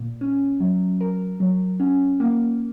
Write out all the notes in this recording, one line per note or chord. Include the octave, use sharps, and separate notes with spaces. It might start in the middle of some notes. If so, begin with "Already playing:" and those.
Already playing: A#2
C#4
F#3
A#4
F#3
C#4
A#3